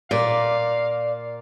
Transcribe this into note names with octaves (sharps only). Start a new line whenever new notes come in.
A#2 D5 F5